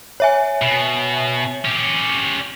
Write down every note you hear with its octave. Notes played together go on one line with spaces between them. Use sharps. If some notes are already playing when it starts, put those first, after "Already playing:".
C#5 E5 G#5
B2
C#4 G4